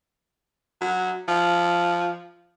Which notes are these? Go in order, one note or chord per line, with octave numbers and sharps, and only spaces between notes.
F#3
F3